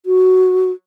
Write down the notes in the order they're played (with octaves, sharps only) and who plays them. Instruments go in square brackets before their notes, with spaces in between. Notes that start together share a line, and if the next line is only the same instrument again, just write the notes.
[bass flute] F#4